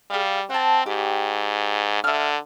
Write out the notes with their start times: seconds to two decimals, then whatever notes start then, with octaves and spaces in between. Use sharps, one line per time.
0.10 G3 G#4 F5
0.50 C4 F#5 A5
0.86 G#2 G4
2.04 D3 E5 F6